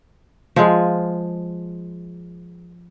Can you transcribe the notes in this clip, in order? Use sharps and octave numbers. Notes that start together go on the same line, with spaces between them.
F3 G#3